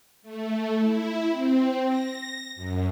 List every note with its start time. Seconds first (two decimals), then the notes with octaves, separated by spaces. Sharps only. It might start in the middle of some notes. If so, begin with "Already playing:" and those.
0.22 A3
0.78 E4
1.29 C4
1.86 A#6
2.55 F#2